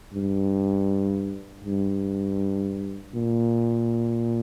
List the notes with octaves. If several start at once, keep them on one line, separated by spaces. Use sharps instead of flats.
G2
G2
A#2